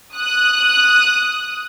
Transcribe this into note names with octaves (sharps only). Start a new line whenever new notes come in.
D#6 F#6